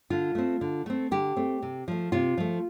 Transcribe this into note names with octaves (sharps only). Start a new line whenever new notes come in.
D3 F4
A3 C4
D3
A3 C4
D3 G4
A3 C4
C3
F3 A3
C3 F4
F3 A3